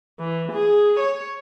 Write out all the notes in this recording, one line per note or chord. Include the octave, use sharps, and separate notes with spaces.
E3
G#4
C#5